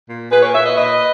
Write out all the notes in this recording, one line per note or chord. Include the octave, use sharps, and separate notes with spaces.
A#2
A#2 G#4 B4
A#4 C#5
A#2 C#5 E5
B4 D#5
A#2 B4 D#5